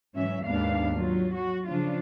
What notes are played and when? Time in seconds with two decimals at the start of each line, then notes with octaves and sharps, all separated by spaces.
0.15 G#2 E3 F#3 C#4 E5
0.45 D#2 G#2 B3 D4 F5
0.96 F#3 F4
1.36 F#4
1.69 C#3 F3 D4 F4